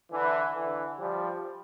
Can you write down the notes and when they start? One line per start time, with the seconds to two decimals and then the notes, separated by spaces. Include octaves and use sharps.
0.11 D3 E3
0.55 D3 E3
0.99 F3 G3